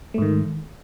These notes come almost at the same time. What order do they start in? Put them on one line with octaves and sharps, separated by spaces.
A3 G#2 D#3